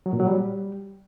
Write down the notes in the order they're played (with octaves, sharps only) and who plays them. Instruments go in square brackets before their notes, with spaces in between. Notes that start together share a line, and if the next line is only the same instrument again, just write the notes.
[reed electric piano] F#3
A#2
F#3
G3